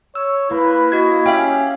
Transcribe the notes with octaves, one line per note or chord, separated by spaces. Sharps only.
C#5 E6
A#3 E4 B4
F#4 D#5 G#6
C#4 G4 E5 F5 G5